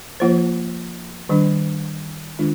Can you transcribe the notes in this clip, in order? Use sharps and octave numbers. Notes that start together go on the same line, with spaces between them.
F3 A#3 F4 C5
D#3 G3 D4
D#3 G#3 D4 F4